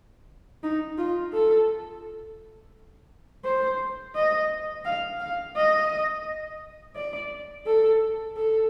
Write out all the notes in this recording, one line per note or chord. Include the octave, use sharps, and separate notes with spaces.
D#4
F4
A4
C5
D#5
F5
F5
D#5
D5
A4
A4